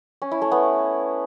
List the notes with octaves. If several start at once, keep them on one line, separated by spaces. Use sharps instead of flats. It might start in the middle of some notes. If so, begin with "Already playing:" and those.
C#4
E4
A3
B3